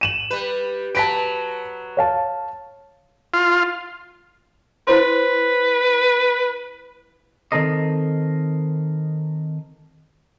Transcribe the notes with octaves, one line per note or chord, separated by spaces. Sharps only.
D#7 E7 F#7
G3 B4
F#3 B4 A5 B6 D7
C#5 F5 A5
F4
E4 B4 C5 C6
D#3 C4 A4 A#4 D#5